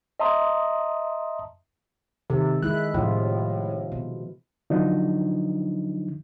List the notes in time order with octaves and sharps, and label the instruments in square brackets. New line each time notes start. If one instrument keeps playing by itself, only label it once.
[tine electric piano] D#5 E5 A5 A#5 C6 D#6
[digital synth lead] C3 [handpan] D#3 A4
[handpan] G#3 E4 [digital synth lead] F#6
[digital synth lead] A2 [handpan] C3 F3 F4
[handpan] B2
[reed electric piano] D3 F3 F#3 D4 D#4